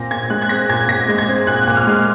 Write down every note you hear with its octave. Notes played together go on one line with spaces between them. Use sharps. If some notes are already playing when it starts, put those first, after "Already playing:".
Already playing: A#2 C4 A#6
A#2 G#6
G#3 F#6
G#6
C4 A#6
A#2 G#6
A#2 A#6
G#3
G#6
C4
A#2 F#6
A#2
F6
G#3